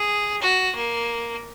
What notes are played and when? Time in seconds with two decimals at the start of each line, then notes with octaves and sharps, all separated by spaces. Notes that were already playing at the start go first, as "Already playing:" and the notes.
Already playing: G#4
0.42 F#4
0.76 A#3